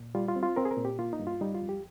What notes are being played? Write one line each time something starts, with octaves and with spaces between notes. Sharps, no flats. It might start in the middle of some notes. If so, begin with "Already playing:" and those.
Already playing: A#2
G3 F4
F4
C4
F4
C4 A#4
G#4
A#4
A#2
G4
A#3 F4
D#4
G2
F4
G3 D#4
F4
F2
G4